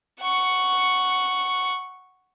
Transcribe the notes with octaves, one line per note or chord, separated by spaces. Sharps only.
F#5 C#6